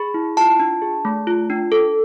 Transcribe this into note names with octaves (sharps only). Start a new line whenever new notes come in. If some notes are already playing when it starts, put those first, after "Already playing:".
Already playing: G#4 B5
E4
F4 A5
D4
G#4
A3
F4
D4
A4